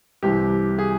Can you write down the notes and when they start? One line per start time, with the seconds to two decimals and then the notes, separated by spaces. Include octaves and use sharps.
0.23 C2 C3 E3 G4
0.78 G#4